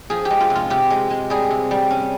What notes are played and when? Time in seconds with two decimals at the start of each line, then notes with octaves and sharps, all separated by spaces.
0.10 F3 G#4
0.25 G4
0.30 G#3
0.40 F4
0.50 C3
0.55 F4
0.70 C3 G4
0.90 G#3
1.10 G#3
1.30 G3 G#4
1.51 C3
1.71 G3
1.91 C#4